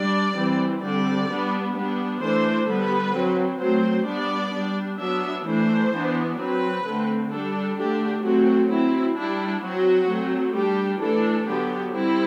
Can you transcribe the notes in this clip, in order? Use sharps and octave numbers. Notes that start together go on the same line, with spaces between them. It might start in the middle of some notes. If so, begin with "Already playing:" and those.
Already playing: G3 D4 D5
E3 G3 C4
D3 G3 C4 D5
G3 B3 D4
G3 B3 D4
E3 A3 D4 C5
D3 G3 B3 B4
F#3 C4
F#3 A3 C4 C5
G3 B3 D4 D5
G3 D4
F#3 B3 D4 E5
E3 A3 D4 C5
E3 B3 D4
F#3 C4 B4
D3 A3 C4
G3 D4 A4
D3 A3 D4 G4
F#3 A3 C4 F#4
F#3 C4 E4
G3 D4 E4
F#3 C4 F#4
F#3 A3 C4
G3 D4 G4
E3 A3 D4 A4
D3 F#3 B3 D4 G4
G3 C4 E4